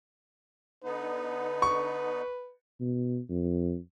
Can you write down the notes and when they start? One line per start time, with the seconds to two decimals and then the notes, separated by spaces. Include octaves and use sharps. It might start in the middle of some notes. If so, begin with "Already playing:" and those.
0.84 D3 B3 D#4 B4
1.62 C#6
2.80 B2
3.29 F2